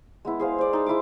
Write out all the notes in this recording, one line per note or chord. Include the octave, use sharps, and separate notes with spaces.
G#3 B3 E4
G#4 C5 F5
C5 D5
D#4 A4
G#3 E4 G#4 D6